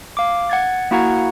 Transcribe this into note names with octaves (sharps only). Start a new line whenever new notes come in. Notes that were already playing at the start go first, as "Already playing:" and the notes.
F5 D6
F#5 G#6 A6
A#3 E4 F#4 F#5 A#5 G#6